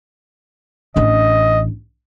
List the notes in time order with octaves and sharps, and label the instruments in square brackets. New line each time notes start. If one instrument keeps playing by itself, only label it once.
[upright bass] A1 D4 [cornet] D#5